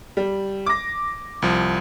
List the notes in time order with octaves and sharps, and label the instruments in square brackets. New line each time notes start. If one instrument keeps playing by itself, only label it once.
[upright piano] G3
D6 A#6
[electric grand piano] C2 F3